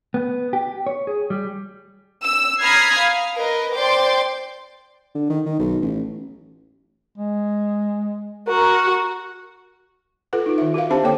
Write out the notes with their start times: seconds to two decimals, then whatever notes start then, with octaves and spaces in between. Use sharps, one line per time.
0.14 B3
0.53 G4
0.87 C#5
1.07 G#4
1.30 G3
2.23 E6
2.61 A#5 B5 D#6 F6 G#6 C7
3.01 F5
3.35 A#4 B4 D#5
3.75 C5 D5 G5 C6 D6
5.15 D3
5.30 D#3
5.46 D#3
5.59 B1
5.82 A1
7.18 G#3
8.48 F#4 A#4
10.33 F4 A4 B4 F#5
10.46 D#4 F4
10.58 D#3 E5
10.74 F#4 A#4 E5 F5
10.90 C4 D4 G4 C5 E5 A5
11.03 D3 A#3 A4 C#5 G5 D6